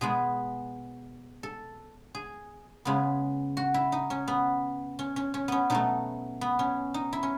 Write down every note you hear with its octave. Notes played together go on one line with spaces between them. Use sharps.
B2 G#3 B3 G#4
A4
G#4
C#3 G#3 B3
F#4
E4
D#4
C#4
B3
C#4
C#4
C#4
B3 C#4
B2 F#3 A3 D#4
B3
C#4
D#4
E4
C#4